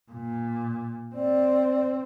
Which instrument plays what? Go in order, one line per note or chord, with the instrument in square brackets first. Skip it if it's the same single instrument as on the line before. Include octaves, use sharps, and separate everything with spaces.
[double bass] A#2
[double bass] C4 [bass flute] D5